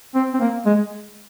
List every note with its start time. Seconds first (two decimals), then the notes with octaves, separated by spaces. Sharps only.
0.15 C4
0.34 C4
0.40 A#3
0.66 G#3